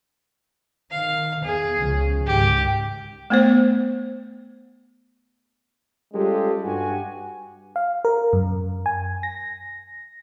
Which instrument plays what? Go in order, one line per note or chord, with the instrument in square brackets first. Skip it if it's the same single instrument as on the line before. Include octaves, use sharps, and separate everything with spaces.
[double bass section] D#3 [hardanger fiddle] F5
[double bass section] E2 [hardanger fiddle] G#4
[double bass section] C#2 C#3 F3
[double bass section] C#2 G#2 D#3 [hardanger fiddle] G4
[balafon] A3 B3 C5
[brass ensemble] G3 G#3 C#4 F4 G4 A4
G2 F#4 G4 G#5
[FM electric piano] F5
A#4
F#2
G#5
A#6